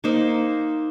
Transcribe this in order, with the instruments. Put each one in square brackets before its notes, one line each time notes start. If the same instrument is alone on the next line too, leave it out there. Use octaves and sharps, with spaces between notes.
[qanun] A#3 D#4 C5